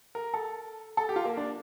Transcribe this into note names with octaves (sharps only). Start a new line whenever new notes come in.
A#4
A4
A4
G4
F4
A#3
D4